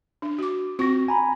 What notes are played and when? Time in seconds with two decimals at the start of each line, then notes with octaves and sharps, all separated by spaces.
0.22 D4
0.38 F#4 D6
0.79 C4 F4 F#4 C#6 A#6
1.08 G#5 A#5 B5